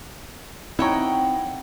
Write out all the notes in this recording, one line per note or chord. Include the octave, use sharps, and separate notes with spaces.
C4 D#4 E4 C#5 F#5 G5 A#5